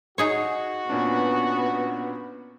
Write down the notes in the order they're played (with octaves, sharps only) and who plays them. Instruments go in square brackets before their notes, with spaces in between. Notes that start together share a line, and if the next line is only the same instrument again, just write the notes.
[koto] D#4 G#4 C#5 [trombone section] F#4
[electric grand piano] A#2 C#4 D4 [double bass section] B3